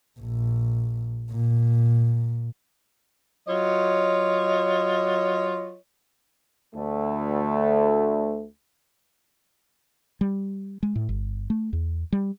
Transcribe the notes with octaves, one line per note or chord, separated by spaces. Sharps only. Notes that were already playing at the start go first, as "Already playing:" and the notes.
A#1
A#2
F#3 F4 C#5 D#5
D2 A3
G3
G#3
A2
G1
A3
E2
G3